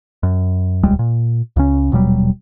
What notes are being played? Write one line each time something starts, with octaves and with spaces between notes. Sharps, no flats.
F#2
D#1 C#2 G3 G#3
A#2
C#2 C#3 C#4
D#1 B2 F#3 G3